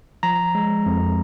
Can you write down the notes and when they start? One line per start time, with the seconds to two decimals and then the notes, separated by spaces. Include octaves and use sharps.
0.23 F3 A#5
0.55 G#3
0.86 F2